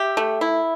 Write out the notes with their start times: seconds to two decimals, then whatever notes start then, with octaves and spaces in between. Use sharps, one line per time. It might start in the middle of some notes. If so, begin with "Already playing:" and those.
Already playing: G4 E5
0.17 A3
0.41 E4